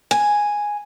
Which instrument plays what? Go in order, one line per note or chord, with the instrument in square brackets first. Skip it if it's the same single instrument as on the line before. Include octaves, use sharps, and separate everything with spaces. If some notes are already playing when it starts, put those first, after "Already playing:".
[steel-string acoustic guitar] G#5